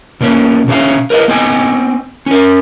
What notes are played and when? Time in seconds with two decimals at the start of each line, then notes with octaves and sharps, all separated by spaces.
0.21 B2 A#3 C#4
0.68 B2 C#4 E5 F5
1.10 A#4 B4 D#5 F5
1.28 B3 C4 D#5 G5 G#5
2.26 C#4 A#4